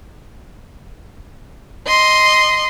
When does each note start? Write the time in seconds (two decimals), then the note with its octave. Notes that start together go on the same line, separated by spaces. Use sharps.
1.88 D#5 C6